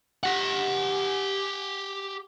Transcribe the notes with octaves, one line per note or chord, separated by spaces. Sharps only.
G4 F#5